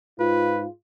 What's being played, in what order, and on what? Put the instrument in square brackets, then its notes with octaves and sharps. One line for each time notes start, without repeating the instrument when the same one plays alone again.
[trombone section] G#2 F4 [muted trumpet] B4